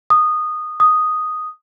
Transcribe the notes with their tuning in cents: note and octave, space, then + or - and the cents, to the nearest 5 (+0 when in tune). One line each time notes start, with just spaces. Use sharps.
D#6 -15
D#6 +0